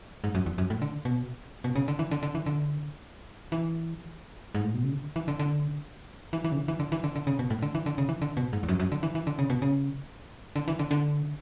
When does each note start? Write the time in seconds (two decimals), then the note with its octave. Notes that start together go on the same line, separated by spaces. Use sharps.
0.24 G#2
0.35 F#2
0.46 E2
0.58 F#2
0.70 A2
0.82 D3
1.05 B2
1.64 B2
1.76 C#3
1.88 D3
1.99 E3
2.11 D3
2.23 D3
2.35 E3
2.46 D3
3.52 E3
4.55 G#2
4.64 A2
4.74 B2
4.84 C#3
4.92 D3
5.16 E3
5.28 D3
5.39 D3
6.33 E3
6.44 E3
6.52 C#3
6.57 D3
6.68 E3
6.80 D3
6.92 E3
7.04 D3
7.16 D3
7.27 C#3
7.39 B2
7.50 A2
7.62 D3
7.75 E3
7.86 D3
7.98 C#3
8.09 E3
8.22 D3
8.37 B2
8.53 G#2
8.63 E2
8.69 F#2
8.80 F#2
8.92 D3
9.03 E3
9.15 E3
9.27 D3
9.39 C#3
9.50 B2
9.62 C#3
10.56 D3
10.68 E3
10.79 D3
10.91 D3